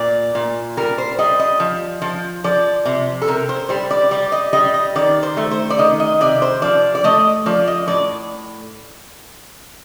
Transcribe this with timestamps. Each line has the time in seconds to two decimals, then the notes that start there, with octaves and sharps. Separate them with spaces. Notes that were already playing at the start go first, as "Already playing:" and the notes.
Already playing: A#2 D5
0.35 A#2
0.77 G3 A#4
0.98 C5
1.19 G3 D#5
1.39 D#5
1.60 F3
2.02 F3
2.44 F3 D5
2.86 C3
3.22 A4
3.28 C3 A#4
3.49 C5
3.69 G3 C5
3.91 D5
4.11 G3 D5
4.32 D#5
4.53 G3 D#5
4.74 D#5
4.95 D#3 D5
5.23 C5
5.37 A3
5.51 C5
5.70 D5
5.79 D#3 D#5
6.00 D#5
6.21 C3 D5
6.42 C5
6.62 F3 D5
6.95 D5
7.04 A3 D#5
7.46 F3 D5
7.68 D#5
7.88 A2 D5